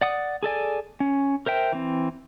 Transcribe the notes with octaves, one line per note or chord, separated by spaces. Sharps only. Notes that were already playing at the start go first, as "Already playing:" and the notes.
D5 F#5 D#6
G#4 A4 D5 G#5
C#4
A#4 C5 E5 G5
E3 C4